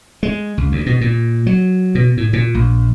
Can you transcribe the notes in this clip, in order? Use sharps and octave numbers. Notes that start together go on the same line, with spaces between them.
G#3
C#2
D2
B2
A#2
F#3
B2
A2
A#2
A#1